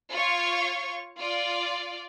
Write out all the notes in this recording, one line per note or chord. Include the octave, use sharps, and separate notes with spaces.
F4 C#5 F5 C#6
F4 D5